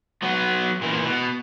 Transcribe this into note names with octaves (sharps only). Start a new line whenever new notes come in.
F#3 B3
A#2 E3
B2